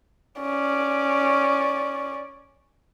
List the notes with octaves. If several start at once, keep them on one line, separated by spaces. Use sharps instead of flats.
C#4 D5